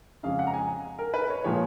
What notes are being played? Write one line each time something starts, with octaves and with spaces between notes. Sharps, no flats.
F2 C#3 G#3 F5
F#5
A#5
G#5
A#4
B4
C#5
A#2 F3 G#3 C#5